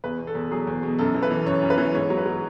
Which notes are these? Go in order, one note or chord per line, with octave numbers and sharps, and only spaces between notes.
E2 B4
B2
A4
E2
F#3 G#4
E2
B2
F#2 A4
E3
B4
E3
F#2 C#5
F#2
B4
E3
G#2 C#5
F#3
B4
F#3